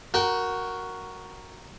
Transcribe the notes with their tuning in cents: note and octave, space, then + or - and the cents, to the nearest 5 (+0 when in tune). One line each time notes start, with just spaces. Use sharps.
F#4 +0 A#4 +0 G5 -25